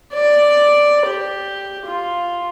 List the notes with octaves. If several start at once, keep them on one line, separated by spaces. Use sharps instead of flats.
D5
G4
F4